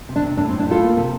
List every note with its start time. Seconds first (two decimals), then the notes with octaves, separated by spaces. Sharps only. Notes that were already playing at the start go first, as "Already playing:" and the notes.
0.09 C3
0.16 D4
0.24 C3
0.37 A2 D4
0.49 C4
0.52 A2
0.59 D4
0.67 A2 F4 A4
0.82 A#3
0.97 C3